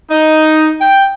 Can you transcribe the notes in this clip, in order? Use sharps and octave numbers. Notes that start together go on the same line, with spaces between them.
D#4
G5